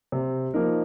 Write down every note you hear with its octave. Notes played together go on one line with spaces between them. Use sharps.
C3
F3 A#3 D#4 A#4